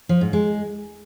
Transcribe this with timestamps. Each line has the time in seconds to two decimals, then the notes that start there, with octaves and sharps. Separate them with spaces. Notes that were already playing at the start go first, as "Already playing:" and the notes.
0.09 F3
0.21 G#2
0.33 G#3